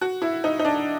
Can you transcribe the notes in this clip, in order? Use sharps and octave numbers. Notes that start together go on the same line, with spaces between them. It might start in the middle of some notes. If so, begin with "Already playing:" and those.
F#4
E4
D#4
D#4
D4